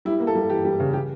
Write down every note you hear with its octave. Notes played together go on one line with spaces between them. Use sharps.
G3 E4
A#3
A4
G3
E3 G4
G3
C#3
G4